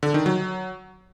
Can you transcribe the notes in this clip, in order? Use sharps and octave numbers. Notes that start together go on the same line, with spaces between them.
D3
D#3
F#3